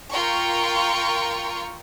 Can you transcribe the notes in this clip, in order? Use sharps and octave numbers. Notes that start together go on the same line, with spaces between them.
F4 A#4 G5 C#6